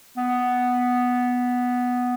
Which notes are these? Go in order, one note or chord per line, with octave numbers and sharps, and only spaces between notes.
B3